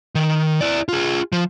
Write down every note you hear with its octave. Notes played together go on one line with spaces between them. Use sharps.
D#3
E4 D5
F4 G#4
F3